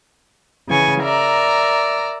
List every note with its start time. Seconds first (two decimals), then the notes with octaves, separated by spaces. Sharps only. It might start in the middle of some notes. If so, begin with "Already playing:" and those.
0.68 C#3 E3 G#5 C#6
1.00 A#4 D5 E5 A#5